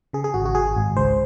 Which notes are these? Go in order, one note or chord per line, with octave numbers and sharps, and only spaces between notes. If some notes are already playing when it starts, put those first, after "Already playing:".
C#3 G#4
G#4
G#1 F#4
F#4
G#1 G#4
G#1
C#2 C5